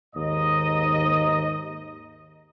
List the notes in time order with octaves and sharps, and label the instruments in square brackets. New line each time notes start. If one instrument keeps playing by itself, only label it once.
[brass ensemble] D#2 G#2 D#4 D#5